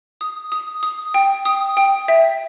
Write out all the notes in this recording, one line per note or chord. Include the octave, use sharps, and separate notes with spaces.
D#6
D#6
D#6
G5
D#6
G5
E5